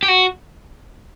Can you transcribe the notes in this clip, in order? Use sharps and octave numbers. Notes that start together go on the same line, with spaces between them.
G4
F#4